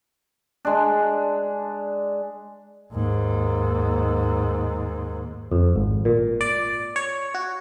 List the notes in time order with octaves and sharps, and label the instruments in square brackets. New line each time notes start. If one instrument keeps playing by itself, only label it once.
[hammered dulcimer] G#3 D4
[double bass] D#2 G#2
[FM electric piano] F2
G#1
A#2
D5
C#5
F#4